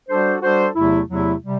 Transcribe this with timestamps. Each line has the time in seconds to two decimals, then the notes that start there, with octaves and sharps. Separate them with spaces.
0.09 G3 D4 F#4 A4 C5
0.41 G3 D4 F#4 A4 C5
0.74 E2 C3 F#3 A3 E4
1.08 E2 C3 F#3 A3 E4
1.42 C3 G3